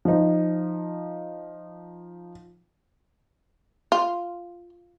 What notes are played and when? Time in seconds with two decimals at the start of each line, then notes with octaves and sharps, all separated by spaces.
0.05 F3 D#4
3.92 F4